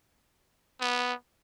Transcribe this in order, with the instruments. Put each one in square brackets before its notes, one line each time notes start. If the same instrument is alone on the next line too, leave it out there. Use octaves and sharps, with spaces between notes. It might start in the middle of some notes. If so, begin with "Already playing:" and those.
[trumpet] B3